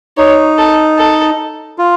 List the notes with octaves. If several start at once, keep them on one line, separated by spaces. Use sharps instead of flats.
D#4 C#5
A4
A4
F4